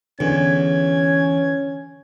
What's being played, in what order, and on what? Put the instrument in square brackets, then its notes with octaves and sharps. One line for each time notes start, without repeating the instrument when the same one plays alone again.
[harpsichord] E2 [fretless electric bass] D3 [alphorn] C#4 [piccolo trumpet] G#6